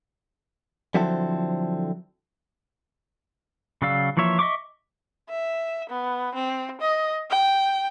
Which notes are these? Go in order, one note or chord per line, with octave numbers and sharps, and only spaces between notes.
D3 F3 F#3 C4 E4 A4
C#3 F#3 D5 F5 E6
E3 F3 A#3 C#5 E5
D#5 E5 C#6 D6
E5
B3
C4
D#5
G5